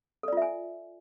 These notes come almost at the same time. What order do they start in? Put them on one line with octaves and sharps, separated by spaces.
A4 D5 F4 E5 G#5